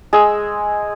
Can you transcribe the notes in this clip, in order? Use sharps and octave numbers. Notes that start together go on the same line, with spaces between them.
G#3 G#4 E6